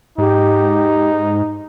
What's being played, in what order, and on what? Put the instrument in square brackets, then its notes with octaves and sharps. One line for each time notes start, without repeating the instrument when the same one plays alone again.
[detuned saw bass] G#2 [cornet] D#4 [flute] G4